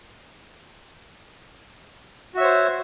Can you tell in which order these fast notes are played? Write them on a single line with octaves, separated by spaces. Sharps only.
F#4 E5 C#5 C5